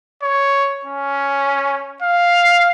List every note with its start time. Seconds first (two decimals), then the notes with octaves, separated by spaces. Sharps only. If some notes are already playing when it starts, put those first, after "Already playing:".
0.23 C#5
0.85 C#4
2.02 F5